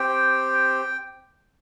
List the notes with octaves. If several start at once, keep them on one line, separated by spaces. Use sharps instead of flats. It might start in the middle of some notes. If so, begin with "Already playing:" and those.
Already playing: C4 G4 G5